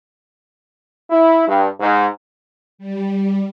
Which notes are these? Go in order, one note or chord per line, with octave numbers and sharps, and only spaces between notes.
E4
G2
G#2
G3